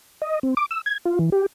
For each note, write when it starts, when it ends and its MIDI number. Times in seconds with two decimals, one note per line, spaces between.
0.22 0.39 75
0.43 0.54 60
0.57 0.66 86
0.71 0.81 88
0.86 0.98 92
1.05 1.19 65
1.19 1.30 52
1.32 1.46 67